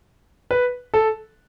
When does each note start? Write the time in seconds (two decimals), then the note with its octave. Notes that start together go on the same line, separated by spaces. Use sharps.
0.51 B4
0.94 A4